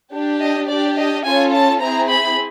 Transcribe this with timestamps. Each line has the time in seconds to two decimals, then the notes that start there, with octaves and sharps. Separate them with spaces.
0.12 D4 G4
0.41 D#5
0.68 D4 G4 D5
0.97 D#5
1.25 C#4 F4 A4 G#5
1.54 A5
1.81 C4 E4 G#4 A#5
2.09 B5